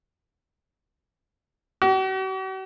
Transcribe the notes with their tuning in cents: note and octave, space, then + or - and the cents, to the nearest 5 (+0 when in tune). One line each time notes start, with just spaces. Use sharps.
F#4 +45